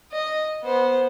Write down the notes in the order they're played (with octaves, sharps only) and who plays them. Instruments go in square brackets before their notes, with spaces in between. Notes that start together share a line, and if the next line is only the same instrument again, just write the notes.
[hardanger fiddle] D#5
B3 C5